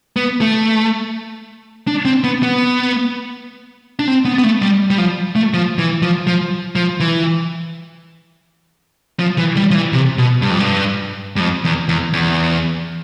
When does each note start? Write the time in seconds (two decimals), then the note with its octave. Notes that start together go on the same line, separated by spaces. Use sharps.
0.16 B3
0.41 A3
1.87 D4
2.05 C4
2.24 B3
2.43 B3
3.99 D4
4.08 C4
4.25 B3
4.38 B3
4.44 A3
4.62 G3
4.91 G3
4.98 F3
5.36 A3
5.54 F3
5.79 E3
6.03 F3
6.27 F3
6.76 F3
7.00 E3
9.19 F3
9.38 E3
9.56 G3
9.71 F3
9.75 E3
9.93 C3
10.18 B2
10.42 G2
10.50 F2
10.59 G2
11.36 G2
11.40 F2
11.64 E2
11.88 E2
12.13 E2